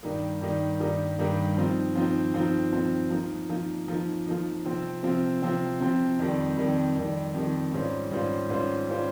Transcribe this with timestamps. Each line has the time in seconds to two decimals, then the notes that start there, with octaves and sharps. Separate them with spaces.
0.03 G2 D#3 G3 A#3 D#4
0.41 G2 D#3 G3 A#3 D#4
0.80 G2 D#3 G3 A#3 D#4
1.19 G2 D#3 G3 A#3 D#4
1.57 F3 C4 D#4
1.95 F3 C4 D#4
2.34 F3 C4 D#4
2.72 F3 C4 D#4
3.11 F3 A#3 D#4
3.49 F3 A#3 D#4
3.88 F3 A#3 D#4
4.27 F3 A#3 D#4
4.65 C3 F3 C4
5.03 C3 F3 C4
5.42 C3 F3 C4
5.80 C3 F3 C4
6.19 F2 D#3 G3
6.57 F2 D#3 G3
6.96 F2 D#3 G3
7.34 F2 D#3 G3
7.73 G#2 G3 C#4 F4 C5
8.12 G#2 G3 C#4 F4 C5
8.50 G#2 G3 C#4 F4 C5
8.89 G3 C#4 F4 C5